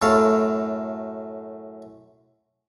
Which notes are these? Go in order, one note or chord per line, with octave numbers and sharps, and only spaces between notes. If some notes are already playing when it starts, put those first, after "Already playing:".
F#2 A2 A4 F5